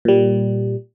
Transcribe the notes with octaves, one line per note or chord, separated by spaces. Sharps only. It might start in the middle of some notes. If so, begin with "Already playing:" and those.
A#2 G3